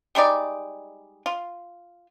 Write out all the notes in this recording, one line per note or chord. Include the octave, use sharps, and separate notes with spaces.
G3 G#3 D#4 D5
F4